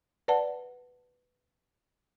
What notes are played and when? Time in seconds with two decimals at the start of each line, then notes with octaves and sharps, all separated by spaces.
0.28 B4 D5 F#5 A5